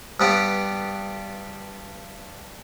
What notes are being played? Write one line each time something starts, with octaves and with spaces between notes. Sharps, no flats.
G2 G3 B3 G4